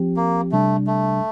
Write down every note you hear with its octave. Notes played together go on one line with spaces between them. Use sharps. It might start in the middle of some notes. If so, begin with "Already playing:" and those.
Already playing: F3 C4 G4
A#3
C3 G3 A3 D4
A3